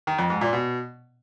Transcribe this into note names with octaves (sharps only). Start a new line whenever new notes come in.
D#3
F2
G#2
A#2
B2